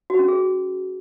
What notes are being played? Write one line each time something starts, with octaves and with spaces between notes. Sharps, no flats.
F#4
C#4
G#4